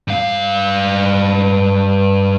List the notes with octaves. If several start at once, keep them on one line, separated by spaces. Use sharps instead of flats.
G2 F5